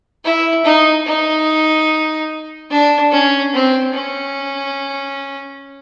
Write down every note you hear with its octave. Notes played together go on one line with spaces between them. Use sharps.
E4
D#4
D#4
D4
C#4
C4
C#4